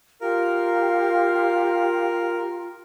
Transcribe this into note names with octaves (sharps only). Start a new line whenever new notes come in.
F4 G4 A#4 F5